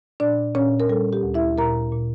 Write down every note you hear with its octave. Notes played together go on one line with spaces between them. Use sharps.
A#2 D4 D5
A#2 C#4 C#5
A#4
G3 A4
G4
D2
E4 E5
A#2 A#4 A#5
A#2